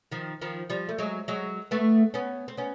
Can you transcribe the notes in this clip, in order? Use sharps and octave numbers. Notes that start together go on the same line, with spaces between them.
D#3 F3
D#3 F3
F3 G3
A3
F#3 G#3
F#3 G#3
A3 B3
B3 C#4
C4
B3 C#4